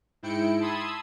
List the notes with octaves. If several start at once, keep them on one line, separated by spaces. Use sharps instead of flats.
G#2 E4 G5 C#7 D7
A5 B5 C6 D#6 E6 G#6